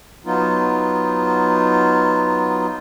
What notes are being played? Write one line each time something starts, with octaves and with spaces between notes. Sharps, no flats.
F#3 B3 D#4 F4